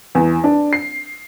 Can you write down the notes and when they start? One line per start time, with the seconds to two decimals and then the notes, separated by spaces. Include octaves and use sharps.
0.15 E2
0.44 D4
0.73 C7